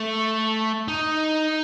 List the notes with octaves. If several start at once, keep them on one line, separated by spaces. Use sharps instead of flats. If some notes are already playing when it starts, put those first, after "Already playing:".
Already playing: A3
D#4